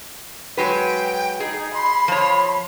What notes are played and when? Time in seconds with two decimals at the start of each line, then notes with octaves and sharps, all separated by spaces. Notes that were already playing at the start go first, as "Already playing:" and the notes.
0.57 F#3 G#3 B4 G5
1.40 D#4 G#4
1.74 B5 C6
2.08 F3 C#5 B5